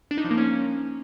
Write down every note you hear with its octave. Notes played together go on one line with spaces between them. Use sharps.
D4
D#4
F3
A#3
C#4